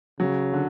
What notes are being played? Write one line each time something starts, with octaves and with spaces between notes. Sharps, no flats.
C#3 F#3
D3